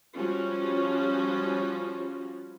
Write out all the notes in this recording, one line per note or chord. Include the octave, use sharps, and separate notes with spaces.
F3 G3 C#4 F4 F#4